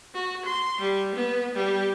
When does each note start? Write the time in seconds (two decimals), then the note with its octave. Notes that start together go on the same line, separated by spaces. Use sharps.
0.14 F#4
0.45 C6
0.80 G3
1.15 B3
1.55 G3